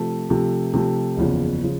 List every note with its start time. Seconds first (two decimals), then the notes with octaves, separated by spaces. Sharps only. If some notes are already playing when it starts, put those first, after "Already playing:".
Already playing: C3 F3 A3
0.30 C3 F3 A3
0.74 C3 F3 A3
1.17 F#1 E2 C#3 F3
1.63 C#3 F3